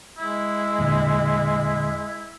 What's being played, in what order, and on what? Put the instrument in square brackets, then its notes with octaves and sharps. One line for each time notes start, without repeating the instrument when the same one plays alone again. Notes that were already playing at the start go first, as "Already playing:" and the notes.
[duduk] G#3 [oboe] E4
[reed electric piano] E2 A#2 D3